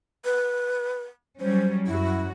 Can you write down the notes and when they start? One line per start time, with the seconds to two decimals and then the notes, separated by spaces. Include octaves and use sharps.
0.25 B4
1.40 F#3 G3 C#4 C5
1.86 F#2 E4 F#4